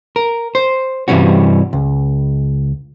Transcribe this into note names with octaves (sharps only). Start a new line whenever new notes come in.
A#4
C5
G2 C3 E3 G3 C#4 F#4
C#2